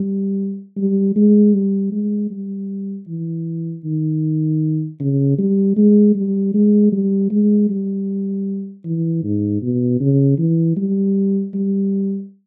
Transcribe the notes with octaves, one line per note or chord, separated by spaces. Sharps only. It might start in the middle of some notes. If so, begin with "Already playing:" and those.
Already playing: G3
G3
G#3
G3
G#3
G3
E3
D#3
C#3
G3
G#3
G3
G#3
G3
G#3
G3
E3
G#2
B2
C#3
E3
G3
G3